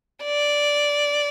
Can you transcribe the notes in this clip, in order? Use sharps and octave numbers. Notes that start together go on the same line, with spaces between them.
D5